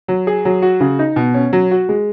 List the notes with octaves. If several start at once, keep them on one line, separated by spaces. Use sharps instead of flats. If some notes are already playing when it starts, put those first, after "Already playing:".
F#3
G#4
F#3
F#4
C#3
D#4
B2
C#4
F#3
F#4
G#3